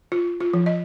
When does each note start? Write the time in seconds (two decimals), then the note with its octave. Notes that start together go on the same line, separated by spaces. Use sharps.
0.12 F4
0.40 F4
0.54 F3
0.66 D#5